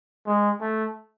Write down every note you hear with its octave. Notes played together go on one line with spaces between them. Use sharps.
G#3
A3